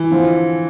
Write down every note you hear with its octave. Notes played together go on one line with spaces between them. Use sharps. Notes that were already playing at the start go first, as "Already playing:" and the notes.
Already playing: E3
D3 F3 C4 F4